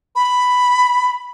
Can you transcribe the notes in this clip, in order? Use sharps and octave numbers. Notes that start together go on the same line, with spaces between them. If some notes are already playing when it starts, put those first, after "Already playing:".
B5